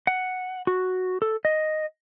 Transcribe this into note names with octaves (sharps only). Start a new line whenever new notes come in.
F#5
F#4
A4
D#5